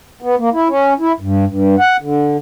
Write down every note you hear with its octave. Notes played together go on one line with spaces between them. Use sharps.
B3
A#3
E4
C#4
E4
G2
G2
F#5
D3